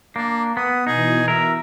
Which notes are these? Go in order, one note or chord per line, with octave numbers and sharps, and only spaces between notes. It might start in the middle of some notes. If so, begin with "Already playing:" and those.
A#3 D4
B3 D#6
B2 E3 D#4 G#4
A#4 E5